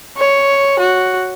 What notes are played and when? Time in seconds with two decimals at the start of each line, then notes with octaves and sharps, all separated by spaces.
0.17 C#5
0.80 F#4